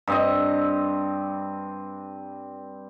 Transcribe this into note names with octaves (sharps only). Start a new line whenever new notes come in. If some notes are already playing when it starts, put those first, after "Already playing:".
G2 C4 D#5